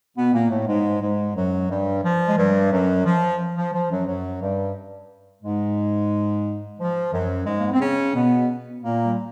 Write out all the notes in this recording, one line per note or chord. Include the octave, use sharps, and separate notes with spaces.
B2 B3
A#2 A#3
A2 A3
G#2 G#3
G#2 G#3
F#2 F#3
G2 G3
F3
G#3
G2 G3
F#2 F#3
F3
F3
F3
F#2 F#3
F#2 F#3
G2 G3
G#2 G#3
F3
F#2 F#3
G#2 G#3
A#3
B3
C4
C#3 C#4
B2 B3
A#2 A#3
G3